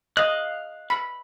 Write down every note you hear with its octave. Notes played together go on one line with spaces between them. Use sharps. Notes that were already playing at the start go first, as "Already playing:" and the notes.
D#5 F5 F#6
B5